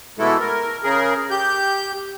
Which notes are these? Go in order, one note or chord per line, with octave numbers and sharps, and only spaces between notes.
B2 E3 G#3 A3 E4 A4
A#4
C#3 G#4 A#4
G4 G6